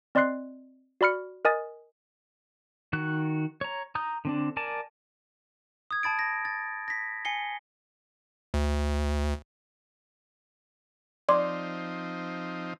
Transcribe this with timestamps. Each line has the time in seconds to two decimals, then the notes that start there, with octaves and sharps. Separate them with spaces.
0.15 C4 D5 D#5 C6 F#6 C7
1.01 F#4 D5 B5 F6 C#7
1.45 A#4 D#5 G#5 D#6 A6
2.93 D#3 F#4 F#6
3.61 C#5 A#5
3.95 A#5 D#6 G6
4.25 D3 C4 D4
4.57 A#4 D5 G#5 A5
5.91 D#6 G#6
6.03 A5 B5 A6 D7
6.19 A#6
6.45 A6
6.88 A#6 B6
7.25 G#5 C7 C#7 G7
8.54 D2
11.29 F3 C4 D#4 D5 C6 D6